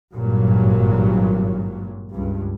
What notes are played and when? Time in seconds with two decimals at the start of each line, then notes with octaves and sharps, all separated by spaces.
0.14 G#1 G2 A#2 F#3
2.11 C#2 G2